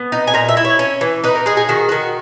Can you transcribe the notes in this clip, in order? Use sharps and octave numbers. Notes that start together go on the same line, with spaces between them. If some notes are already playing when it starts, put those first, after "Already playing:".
Already playing: B3
D#4
G#5
A#2 A#5
E5
E4
C#5
C#4
E3
D#4 B4
A#4
G#3 G#4
G#4
D#3 F#4
D#3 F#4